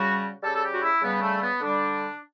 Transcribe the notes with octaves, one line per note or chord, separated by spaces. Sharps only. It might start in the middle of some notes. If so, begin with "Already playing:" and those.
Already playing: C#3 G3 F#4
C#3 G3 A4
A4
G4
F#4
E4
C#3 G3 B3
A3
B3
D3 G3 D4